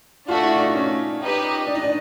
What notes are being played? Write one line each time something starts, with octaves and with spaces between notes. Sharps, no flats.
A3 D4 F4 F#4 A4
E4
D#4
C#4
D#4 G4 B4 D#5
D4
D#4
D4